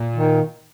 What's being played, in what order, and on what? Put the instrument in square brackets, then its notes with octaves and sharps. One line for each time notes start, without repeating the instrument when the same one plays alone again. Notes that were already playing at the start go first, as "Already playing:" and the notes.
Already playing: [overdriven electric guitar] A#2
[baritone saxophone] D#3